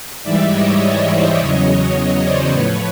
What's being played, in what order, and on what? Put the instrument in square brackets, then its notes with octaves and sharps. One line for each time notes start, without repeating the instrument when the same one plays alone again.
[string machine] G#2 E3 G3 D5 E5
C#5 D#5
C5 D5
E2 C#3 F#3 C#5 D#5
C5 D5
A2 F3 B4 C#5